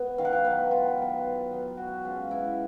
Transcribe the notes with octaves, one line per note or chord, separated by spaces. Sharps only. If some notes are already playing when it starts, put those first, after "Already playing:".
Already playing: B3
D#3 F5
F#5
F5
F#3 B3 B4
D#3 F4
F#3 B3
D#3
F#3 B3
B2 F#4
G#3 C#4 F4
B2 E4